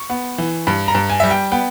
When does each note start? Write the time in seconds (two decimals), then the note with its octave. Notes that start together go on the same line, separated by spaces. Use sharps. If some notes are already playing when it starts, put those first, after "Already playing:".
Already playing: C#6
0.10 B3
0.38 E3
0.67 G2 B5
0.88 A#5
0.95 G2
1.10 G#5
1.20 G3 E5
1.31 G5
1.52 B3 G5